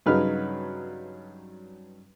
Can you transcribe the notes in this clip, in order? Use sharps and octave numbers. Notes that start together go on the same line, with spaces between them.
G2 C#3 F#3 D#4 B4 F6